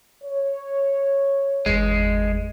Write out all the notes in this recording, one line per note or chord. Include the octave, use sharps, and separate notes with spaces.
C#5
G1 E2 G#3